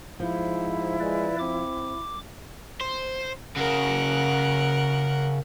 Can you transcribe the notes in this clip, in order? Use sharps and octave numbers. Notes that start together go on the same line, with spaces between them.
G#2 F3 E4
G#3 B4 D5
C4 D6
C5
C#3 F#4 A#4 F#5